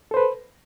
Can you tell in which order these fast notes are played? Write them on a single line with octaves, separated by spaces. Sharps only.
A4 C5 B4